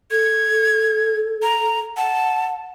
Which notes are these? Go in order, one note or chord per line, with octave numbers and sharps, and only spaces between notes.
A4 G#6
A#5
F#5 A5